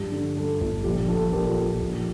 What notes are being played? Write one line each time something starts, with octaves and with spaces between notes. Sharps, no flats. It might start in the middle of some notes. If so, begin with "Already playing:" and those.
Already playing: G2 F3 G4
D3
G2 A4
G1 A4
A#1 G4
F3 A4
A4
A#1 G4 A#4
A#1
A#1